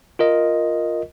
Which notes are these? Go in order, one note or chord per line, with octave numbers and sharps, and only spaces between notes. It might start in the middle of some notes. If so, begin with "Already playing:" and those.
F4 A#4 D#5